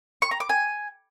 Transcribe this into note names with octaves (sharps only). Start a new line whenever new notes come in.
C#6
A#5
D6
G#5